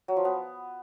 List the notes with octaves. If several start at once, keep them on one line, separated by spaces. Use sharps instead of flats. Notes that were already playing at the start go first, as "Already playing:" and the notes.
F#3
F3
B3